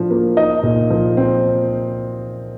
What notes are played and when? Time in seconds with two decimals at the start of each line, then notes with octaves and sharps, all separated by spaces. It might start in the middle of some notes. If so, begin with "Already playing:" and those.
Already playing: A2 F3 D4
0.11 A#3
0.37 D#4 D#5
0.63 A#2
0.90 F3
1.17 C4